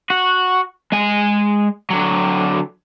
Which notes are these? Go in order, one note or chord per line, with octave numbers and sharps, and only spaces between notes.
F#4
G#3 G#5
D3 F#3